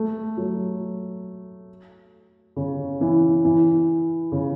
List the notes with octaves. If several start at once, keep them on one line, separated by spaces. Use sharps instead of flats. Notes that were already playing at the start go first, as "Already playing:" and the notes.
Already playing: A3
F#3
C#3
E3
E3
C#3